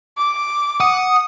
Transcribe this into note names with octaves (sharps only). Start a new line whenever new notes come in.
D6
F#5 D#6